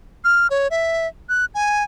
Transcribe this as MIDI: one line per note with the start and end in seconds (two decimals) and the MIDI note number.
0.24 0.47 89
0.50 0.68 73
0.71 1.07 76
1.29 1.45 90
1.55 1.84 80